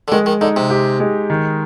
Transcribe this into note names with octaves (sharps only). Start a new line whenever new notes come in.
D3
D#3 G#3
D#3
D3 D#4
C3
G4
G#3
D#3